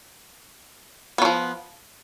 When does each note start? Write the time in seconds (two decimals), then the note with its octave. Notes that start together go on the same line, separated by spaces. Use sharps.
1.18 B3
1.22 F#3
1.25 F3